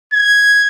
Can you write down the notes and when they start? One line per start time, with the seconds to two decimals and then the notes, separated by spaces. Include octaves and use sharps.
0.13 G#6